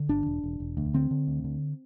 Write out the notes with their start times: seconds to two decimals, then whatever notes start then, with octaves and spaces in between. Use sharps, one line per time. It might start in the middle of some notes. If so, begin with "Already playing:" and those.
Already playing: D3
0.09 G1 D4
0.26 E1
0.44 E1
0.60 E1
0.77 D2
0.94 D3 C4
1.11 D3
1.28 D2
1.44 D3